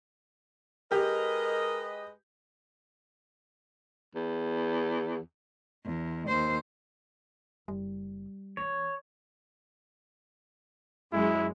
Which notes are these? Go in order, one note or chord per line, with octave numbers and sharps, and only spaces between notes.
G#3 G4 A#4 B4 D#5
E2
E2
D#2 C5
F#1 G3
E3 B3 C#5
F#2 G#3 E4